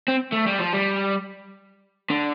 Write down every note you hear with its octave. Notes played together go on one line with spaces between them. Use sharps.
C4
A3
G3
F3
G3
D3